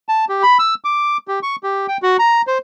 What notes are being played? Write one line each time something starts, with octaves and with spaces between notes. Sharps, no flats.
A5
G4
B5
E6
D6
G4
C#6
G4
G5
F#4
A#5
C5